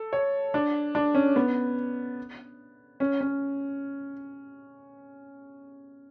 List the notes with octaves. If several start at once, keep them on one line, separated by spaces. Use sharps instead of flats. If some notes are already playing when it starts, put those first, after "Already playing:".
Already playing: A4
C#5
D4
D4
C#4
B3
C#4
C#4